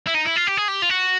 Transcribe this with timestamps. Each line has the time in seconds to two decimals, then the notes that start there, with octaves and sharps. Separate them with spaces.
0.07 E4
0.14 D#4
0.25 E4
0.36 F4
0.47 G4
0.57 G#4
0.68 G4
0.82 F4
0.90 F#4